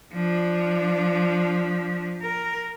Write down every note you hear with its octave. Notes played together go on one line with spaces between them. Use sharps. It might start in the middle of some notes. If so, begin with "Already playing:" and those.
F3 D4
A#4